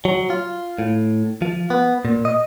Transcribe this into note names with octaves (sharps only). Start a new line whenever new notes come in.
F#3
F4
A2
F3
B3
A#2
D#5